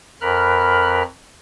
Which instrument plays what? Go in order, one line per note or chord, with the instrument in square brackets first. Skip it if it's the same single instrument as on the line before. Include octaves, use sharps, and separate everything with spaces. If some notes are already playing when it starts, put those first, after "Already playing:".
[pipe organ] F2 A#4 B5 F6 F#6